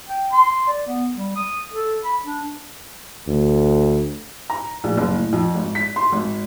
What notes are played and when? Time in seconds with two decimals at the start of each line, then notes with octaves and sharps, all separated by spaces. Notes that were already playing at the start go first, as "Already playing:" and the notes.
0.09 G5
0.32 C6
0.68 D5
0.87 B3
1.16 G3
1.36 D#6
1.73 A4
2.04 B5
2.24 D4
3.28 D2
4.50 A#5
4.84 A#1
4.97 F#1
5.14 A2
5.33 F2
5.55 G#1
5.75 B6
5.96 C6
6.12 G#1